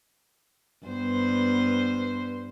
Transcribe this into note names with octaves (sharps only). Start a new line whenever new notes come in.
G2 B3 C5